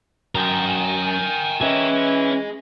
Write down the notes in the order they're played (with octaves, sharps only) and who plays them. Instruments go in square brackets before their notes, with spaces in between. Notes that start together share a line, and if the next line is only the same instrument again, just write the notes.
[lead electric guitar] F#2 [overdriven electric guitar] A#4 G5 [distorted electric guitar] G#5 A#5
[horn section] E3 [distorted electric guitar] C#4 G#5 [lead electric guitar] G#4 D#5